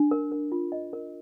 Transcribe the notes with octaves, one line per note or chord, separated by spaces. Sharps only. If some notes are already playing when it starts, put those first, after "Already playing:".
Already playing: D4
A#4
A#4
F4
D#5
A#4